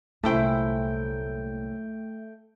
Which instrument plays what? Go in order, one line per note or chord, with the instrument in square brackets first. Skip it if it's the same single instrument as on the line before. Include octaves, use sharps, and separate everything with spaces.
[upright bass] C2 A#2 [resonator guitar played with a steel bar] F#2 E4 C5 [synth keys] A3 G5